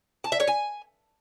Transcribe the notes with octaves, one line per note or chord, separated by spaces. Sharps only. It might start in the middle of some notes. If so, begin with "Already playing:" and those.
A5
E5
C#5
G#5